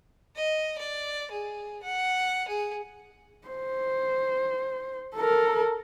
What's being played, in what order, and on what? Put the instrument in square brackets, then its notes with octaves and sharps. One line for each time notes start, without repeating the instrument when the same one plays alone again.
[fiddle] D#5
D5
G#4
F#5
G#4
[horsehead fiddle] C5
A4 A#4